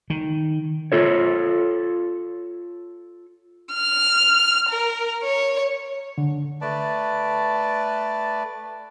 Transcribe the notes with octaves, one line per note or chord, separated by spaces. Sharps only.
D#3
F4 A4 C#5
F6
A#4
C#5
D3
A3 B4 D5 A5